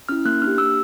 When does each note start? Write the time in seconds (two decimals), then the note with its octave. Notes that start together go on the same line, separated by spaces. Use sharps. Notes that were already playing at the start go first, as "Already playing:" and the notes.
0.09 C#4 E4 F6
0.25 A#3 F#6
0.42 D4 G4 F6
0.58 A#3 E6